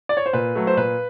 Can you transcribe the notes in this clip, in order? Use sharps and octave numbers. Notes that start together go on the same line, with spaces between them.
D5
C#5
C5
A#2 B4
F#3 A3
C5
A#2 B4